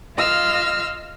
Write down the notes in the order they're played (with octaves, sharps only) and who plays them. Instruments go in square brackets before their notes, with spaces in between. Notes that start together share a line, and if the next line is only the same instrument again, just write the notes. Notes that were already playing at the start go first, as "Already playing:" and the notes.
[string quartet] F4 D#5 F5 E6 F6